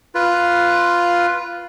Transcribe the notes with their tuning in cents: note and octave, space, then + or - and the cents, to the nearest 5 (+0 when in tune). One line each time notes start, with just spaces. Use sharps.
F4 +0 B4 +0